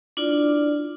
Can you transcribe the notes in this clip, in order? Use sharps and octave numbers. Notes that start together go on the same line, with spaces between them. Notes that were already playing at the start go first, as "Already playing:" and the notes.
D4 E4 F4 D5